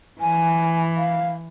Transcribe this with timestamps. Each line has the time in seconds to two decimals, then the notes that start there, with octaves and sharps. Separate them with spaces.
0.21 E3 G#5
0.97 F5